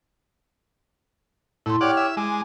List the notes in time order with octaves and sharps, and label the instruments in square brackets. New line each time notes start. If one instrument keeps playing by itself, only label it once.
[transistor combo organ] A2 [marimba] E4 C6
[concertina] G4 C#5 F6 [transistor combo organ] D5 F#5
[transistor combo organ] E5
[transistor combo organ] G#3 [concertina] D6